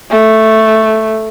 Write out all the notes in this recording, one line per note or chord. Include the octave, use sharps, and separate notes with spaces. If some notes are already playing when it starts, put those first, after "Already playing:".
A3